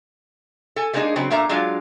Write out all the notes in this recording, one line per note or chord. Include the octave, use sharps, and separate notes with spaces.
A4 G#5
G3 G#3 A#3 D4 D#4 G#4
C#3 F#3 C4
A#2 A3 A#3 D4 E5 A#5
F#3 G#3 D4 F4 F5